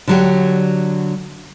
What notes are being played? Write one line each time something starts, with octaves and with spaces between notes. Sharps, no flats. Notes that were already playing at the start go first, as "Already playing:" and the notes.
D3 F#3 G4